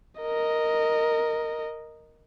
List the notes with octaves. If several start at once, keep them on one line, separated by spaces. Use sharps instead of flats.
A#4 D#5